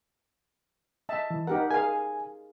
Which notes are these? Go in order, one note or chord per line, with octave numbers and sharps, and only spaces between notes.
D#5 E5 A5
E3
D#4 G4 A#4 F#5
G#4 A#4 F5 G#5